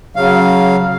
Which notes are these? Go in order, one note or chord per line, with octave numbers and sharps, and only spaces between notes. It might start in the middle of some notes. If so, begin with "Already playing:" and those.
C#3 F#3 F5